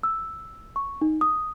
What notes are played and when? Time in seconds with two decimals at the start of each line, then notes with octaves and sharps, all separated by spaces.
0.03 E6
0.76 C#6
1.01 D#4
1.21 D#6